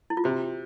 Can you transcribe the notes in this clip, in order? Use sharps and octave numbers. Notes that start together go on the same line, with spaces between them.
E4
F4
C3 F#4